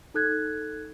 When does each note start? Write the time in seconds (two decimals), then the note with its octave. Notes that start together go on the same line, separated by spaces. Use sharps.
0.14 D#4 A4 F#6 G#6